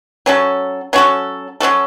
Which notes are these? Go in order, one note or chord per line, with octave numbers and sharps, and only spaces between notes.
F#3 C#4 F#4 A4
F#3 C#4 F#4 A4
F#3 C#4 F#4 A4